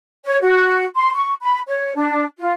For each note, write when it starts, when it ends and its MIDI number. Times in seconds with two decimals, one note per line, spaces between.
0.25 0.37 73
0.42 0.84 66
0.95 1.12 84
1.14 1.32 85
1.41 1.59 83
1.67 1.92 73
1.95 2.23 62
2.38 2.51 65